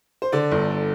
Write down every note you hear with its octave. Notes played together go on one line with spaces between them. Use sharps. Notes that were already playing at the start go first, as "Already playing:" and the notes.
C5
D3 D5
G1